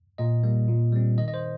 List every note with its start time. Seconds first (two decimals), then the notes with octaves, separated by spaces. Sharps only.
0.18 A#2 D#5
0.44 G3 A#3
0.68 A#2
0.93 G3 C4
1.18 D#3 D#5
1.28 D#5
1.34 C5